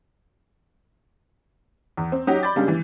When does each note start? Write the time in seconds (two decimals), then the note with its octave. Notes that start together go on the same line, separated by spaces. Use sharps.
1.97 E2
2.12 C4
2.27 F#3 C#4 D#4 F#4 G4
2.43 D5 B5 D6 G6 A6
2.56 C#3 G3 G#3 A#3 D4 G4
2.68 E3